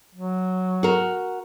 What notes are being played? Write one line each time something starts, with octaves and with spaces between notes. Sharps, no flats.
F#3
F#4 A#4